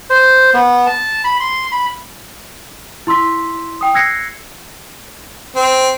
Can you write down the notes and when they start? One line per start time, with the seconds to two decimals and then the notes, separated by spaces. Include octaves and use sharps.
0.10 C5
0.54 B3
0.87 A5
1.24 B5
1.40 C6
1.72 B5
3.07 E4 C6 E6 B6
3.81 G5 D#6
3.94 E6 F#6 G#6 A#6 C7 C#7
5.56 C4